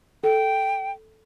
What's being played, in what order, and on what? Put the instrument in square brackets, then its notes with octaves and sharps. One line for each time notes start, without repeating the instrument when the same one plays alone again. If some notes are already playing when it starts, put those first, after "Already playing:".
[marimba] A4 [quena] G5